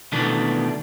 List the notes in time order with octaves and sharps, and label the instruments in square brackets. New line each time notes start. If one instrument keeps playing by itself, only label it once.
[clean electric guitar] B2 D#3 E3 A3 B3 D4